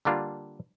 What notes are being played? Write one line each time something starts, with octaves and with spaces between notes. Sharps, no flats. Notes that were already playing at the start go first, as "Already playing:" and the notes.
D3 G3 A#3 D4 F4